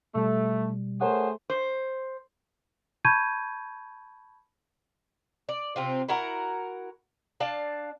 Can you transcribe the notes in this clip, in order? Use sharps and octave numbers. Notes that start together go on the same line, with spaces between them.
B2 G3 A3
A3 G#4 A#4 C5 C#5 F#5
C5
A5 B5 C#6 G6 G#6 D#7
D5
C3 C4 F4
E4 F#4 A#4 F#5
D4 D5 F5 A5